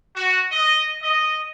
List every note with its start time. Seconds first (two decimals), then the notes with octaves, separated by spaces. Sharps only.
0.14 F#4
0.52 D#5
1.02 D#5